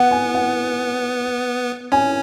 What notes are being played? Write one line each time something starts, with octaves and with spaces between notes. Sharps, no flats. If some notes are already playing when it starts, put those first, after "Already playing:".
Already playing: B3 F#5
G#5
F#5
C#4 G#5